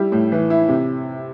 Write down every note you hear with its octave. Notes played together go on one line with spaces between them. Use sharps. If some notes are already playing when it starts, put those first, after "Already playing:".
Already playing: G3 E4
A2
E3
E4
C3